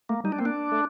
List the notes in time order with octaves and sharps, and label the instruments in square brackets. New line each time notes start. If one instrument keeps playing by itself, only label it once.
[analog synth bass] A3 [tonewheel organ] A#3
[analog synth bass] G3 [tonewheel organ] D#4
[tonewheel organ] D4
[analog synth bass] A#3 [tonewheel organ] C4
[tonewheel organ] D4
[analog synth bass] A3